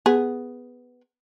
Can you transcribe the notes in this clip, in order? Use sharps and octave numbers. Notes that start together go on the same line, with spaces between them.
B3 G#4